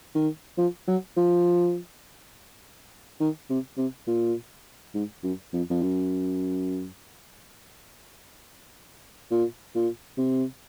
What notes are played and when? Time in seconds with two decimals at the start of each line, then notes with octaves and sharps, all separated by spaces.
0.15 D#3
0.58 F3
0.88 F#3
1.17 F3
3.20 D#3
3.50 C3
3.78 C3
4.07 A#2
4.95 G#2
5.24 F#2
5.53 F2
5.70 F2
5.82 F#2
9.31 A#2
9.75 A#2
10.18 C3